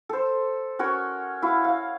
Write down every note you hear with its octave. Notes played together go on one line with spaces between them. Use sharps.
A4 C5
C#4 F#4 A#4 C#5
E4 F#4 F5
F5